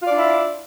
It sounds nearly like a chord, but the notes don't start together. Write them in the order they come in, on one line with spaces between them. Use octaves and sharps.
F4 D5 D4 E4